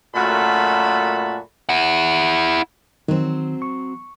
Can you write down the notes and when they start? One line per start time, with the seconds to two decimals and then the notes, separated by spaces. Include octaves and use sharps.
0.16 F#2 A#2 A3 F#4 A5 B5
1.69 E4 F#5
3.08 D#3 F#3 C4
3.62 C#6